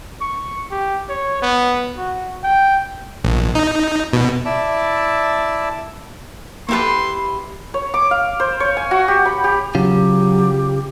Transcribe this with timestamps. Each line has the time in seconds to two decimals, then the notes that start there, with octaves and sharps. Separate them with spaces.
0.21 C#6
0.71 G4
1.09 C#5
1.42 B3
1.97 F#4
2.43 G5
3.24 A#1
3.55 D#4
4.13 B2
4.45 E4 D5 E5 A5
6.69 A#3 E4 G4 A4 B4 C6
7.74 C#5
7.94 D6
8.11 F5
8.40 C5
8.60 C#5
8.77 G#5
8.91 F#4
9.08 G4
9.25 B5
9.44 G4
9.75 C#3 F#3 F4 G4